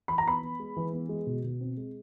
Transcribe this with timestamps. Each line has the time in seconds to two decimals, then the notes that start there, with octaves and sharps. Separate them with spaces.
0.08 E3 B5
0.18 A#5
0.26 B3 B5
0.42 B3
0.59 G#3
0.77 E3
0.93 B3
1.09 G#3
1.26 B2
1.44 B2
1.60 C4
1.77 G#3